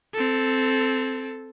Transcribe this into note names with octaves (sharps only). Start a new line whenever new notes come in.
C4 A4